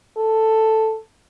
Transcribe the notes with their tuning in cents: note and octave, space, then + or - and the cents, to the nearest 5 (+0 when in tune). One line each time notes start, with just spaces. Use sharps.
A4 +5